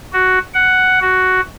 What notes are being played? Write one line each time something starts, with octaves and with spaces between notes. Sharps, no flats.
F#4
F#5
F#4